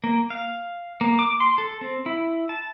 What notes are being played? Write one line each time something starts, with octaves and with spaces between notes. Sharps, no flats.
A#3
F5
A#3
D6
C6
A4
C4
E4
A5